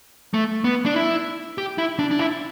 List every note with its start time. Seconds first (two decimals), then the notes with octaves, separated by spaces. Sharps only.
0.34 A3
0.64 B3
0.86 D4
0.96 E4
1.58 G4
1.78 E4
1.99 D4
2.11 D4
2.19 E4